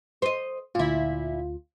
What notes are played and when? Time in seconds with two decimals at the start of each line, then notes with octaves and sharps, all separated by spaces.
0.22 C5 D#5
0.75 D2 A#2 E4 F4